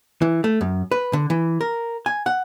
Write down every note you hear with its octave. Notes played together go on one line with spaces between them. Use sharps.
E3
A3
F#2
B4
D3
E3
A#4
G#5
F#5